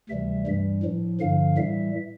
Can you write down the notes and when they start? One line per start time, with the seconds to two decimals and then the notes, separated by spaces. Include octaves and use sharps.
0.09 D2 C3 E3 G3 E5
0.46 G2 E3 G3
0.83 A2 F3
1.20 G2 D3 F3 F5
1.57 A2 E3 G3 E5